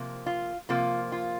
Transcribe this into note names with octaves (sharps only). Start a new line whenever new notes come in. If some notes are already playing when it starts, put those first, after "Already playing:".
Already playing: C3 F3 A#3
F4
C3 F3 A#3 F4
F4